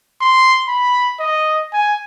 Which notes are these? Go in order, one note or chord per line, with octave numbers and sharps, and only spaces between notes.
C6
B5
D#5
G#5